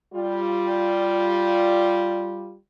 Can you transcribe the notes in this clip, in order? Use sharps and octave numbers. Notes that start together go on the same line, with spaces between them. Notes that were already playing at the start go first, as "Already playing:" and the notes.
G3 F4